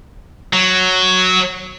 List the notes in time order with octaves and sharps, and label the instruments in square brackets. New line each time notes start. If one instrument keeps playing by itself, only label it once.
[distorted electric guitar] F#3